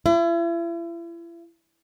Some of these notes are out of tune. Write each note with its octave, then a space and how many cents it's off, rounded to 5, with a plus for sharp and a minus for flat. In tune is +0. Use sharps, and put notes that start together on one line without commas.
E4 +40